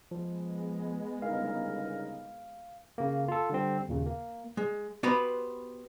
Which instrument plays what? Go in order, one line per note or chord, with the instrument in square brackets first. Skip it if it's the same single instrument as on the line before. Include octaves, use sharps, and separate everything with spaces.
[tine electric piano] F3 [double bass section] G#3 B3
[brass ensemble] G1 C#3 D#4 [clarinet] A#4 [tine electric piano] F5
[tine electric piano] C#3 A#3
F4 A4
D3 G3 C4
D#2 A#2 C#3
A#3
[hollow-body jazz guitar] G#3
B3 F#4 G4 B4 C5 A#5